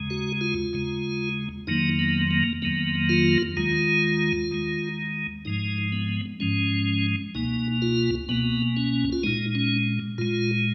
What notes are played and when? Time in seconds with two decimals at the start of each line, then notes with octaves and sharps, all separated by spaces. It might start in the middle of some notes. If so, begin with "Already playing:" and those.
Already playing: D#2 C#3 G#3
0.10 F#4
0.41 F4
0.73 D#2 C#3 G#3
1.67 F2 D#3 F#3 A#3 D#4
1.99 B3
2.31 A#3
2.62 F2 D#3 F#3 A#3 B3
3.09 F4
3.57 D#2 D#3 G#3 F4
4.51 D#2 D#3 G#3
5.45 G#2 F3 G#3 D#4
5.92 B3
6.40 G#2 F3 G#3 C#4
7.35 C#2 B2 A#3 D#4
7.82 F4
8.29 C#2 B2 A#3 B3
8.77 C#4
9.13 F4
9.24 A#2 G#3 D#4
9.55 C#4
10.18 A#2 G#3 F4